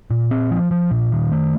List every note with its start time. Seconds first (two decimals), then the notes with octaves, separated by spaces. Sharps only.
0.11 A#2
0.31 C4
0.51 F3
0.71 F3
0.91 A#2
1.12 D#3
1.32 A3